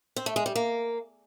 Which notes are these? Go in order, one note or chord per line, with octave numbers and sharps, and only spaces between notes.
C4
A3
G#3
G3
A#3